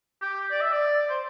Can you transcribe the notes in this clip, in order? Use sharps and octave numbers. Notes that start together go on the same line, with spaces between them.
G4
D5
E5
D5
C5